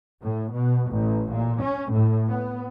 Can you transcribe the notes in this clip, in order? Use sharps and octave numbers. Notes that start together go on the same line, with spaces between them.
A2
B2
A1
A#2
C#4
A2
B3